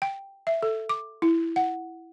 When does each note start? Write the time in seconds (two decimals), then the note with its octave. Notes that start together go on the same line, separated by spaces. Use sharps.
0.02 G5
0.47 E5
0.63 A4
0.89 D6
1.22 E4
1.56 F#5